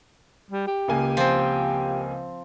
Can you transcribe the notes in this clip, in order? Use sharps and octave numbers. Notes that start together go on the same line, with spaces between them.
G3
G4
C#2 A#3 G#5
F3 C4